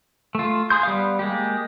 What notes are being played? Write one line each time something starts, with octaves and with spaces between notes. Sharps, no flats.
A3 F4
G#4 C6 G6
G3 B3 F5
G#3 A#3 G4